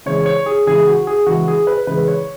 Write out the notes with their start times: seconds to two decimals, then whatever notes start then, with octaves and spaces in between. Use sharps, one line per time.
0.06 C#3 E3 G#3 C#5
0.26 C#5
0.46 G#4
0.66 C#3 E3 G#3 G#4
0.87 F#4
1.07 G#4
1.26 C#3 E3 G#3 F#4
1.48 G#4
1.67 B4
1.87 C#3 E3 G#3 B4
2.08 C#5